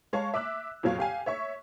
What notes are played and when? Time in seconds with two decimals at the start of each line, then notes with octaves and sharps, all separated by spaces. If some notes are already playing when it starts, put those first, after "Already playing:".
0.13 G#3 C#5 F5 A5 C#6
0.34 E5 D6 E6 F#6
0.83 F2 A#2 F#3 C#5 F5
0.99 G4 F5 G#5
1.26 C#5 E5 C#6